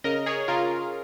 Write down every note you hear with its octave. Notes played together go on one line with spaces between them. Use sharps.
C#3 A#4 D#5
G#4 C#5
C#3 F4 A#4